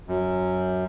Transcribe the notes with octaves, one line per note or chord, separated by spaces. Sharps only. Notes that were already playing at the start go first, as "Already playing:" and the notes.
F#2